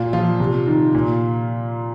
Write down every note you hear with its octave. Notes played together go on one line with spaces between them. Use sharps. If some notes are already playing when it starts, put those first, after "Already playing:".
Already playing: A#2 F4
F3 F4
C3
D#3
A#2